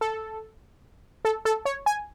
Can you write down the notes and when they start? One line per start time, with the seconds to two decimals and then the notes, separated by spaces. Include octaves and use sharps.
0.01 A4
1.25 A4
1.45 A4
1.65 C#5
1.86 G#5